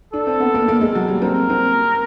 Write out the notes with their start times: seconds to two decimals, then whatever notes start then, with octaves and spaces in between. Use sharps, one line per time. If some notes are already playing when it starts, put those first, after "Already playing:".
0.13 D4 A4
0.27 C4
0.40 B3
0.54 A#3
0.68 A#3
0.81 G#3
0.95 F#3
1.08 G3
1.22 C4 A#4
1.50 C4